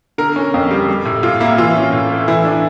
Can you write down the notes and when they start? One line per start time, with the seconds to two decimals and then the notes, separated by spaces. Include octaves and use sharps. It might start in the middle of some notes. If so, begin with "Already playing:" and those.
0.18 D3 A#4
0.36 C#4
0.54 F2
0.71 G3
0.88 G3
1.05 A2
1.23 A2 F4
1.40 A#3 E4
1.58 E3 F4
1.75 C#4
1.93 A2
2.10 A3
2.28 E3 E4
2.45 D4